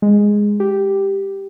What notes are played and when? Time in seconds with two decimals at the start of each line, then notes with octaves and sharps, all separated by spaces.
0.02 G#3
0.60 G4